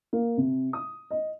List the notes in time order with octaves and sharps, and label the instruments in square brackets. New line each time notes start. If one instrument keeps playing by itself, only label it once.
[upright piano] A#3
C3
D#6
D#5